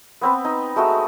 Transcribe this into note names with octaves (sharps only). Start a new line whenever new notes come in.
B3 C4 B4
D#4
G#3 A3 D#4 F#4